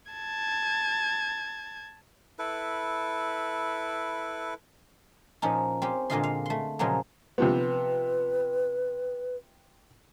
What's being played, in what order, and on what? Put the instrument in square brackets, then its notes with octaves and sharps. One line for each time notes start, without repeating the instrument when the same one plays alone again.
[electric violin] A5 G#6
[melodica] E4 A4 B4
[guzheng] A#2 F3 C#4 D#4
C4 C#4 G4
A#2 D3 G#3 F4 D#5 C6
F5
A3 C6
A#2 C#3 F3 F#3 G#3 A#3
[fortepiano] C3 F3 B3 [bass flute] B4